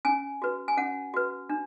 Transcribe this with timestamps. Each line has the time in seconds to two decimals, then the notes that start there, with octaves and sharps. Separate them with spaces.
0.05 C#4 G#5
0.42 F#4 B4
0.68 G#5
0.77 C#4 F#5
1.14 F#4 B4
1.50 D4